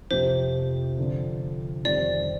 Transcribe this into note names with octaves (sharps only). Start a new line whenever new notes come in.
F2 C3 F3 C5
D3 F3 C4
F2 D#3 G3 C4 D5